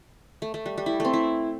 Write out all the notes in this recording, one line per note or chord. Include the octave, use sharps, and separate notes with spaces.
A3
A3
G3
G3
E4
A3 C4
E4